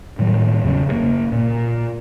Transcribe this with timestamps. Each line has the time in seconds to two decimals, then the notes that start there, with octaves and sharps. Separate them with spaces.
0.19 A2 D#3 F#3 G3
0.64 E2 C#3 C#4
0.87 F#1 C3 A#3
1.32 A#2